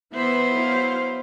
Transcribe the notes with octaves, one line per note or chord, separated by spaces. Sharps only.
E3 B3 C5 E5 B5
F#3 E4 F5